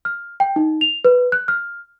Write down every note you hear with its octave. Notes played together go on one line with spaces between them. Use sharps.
F6
G5
D#4
F7
B4
F#6
F6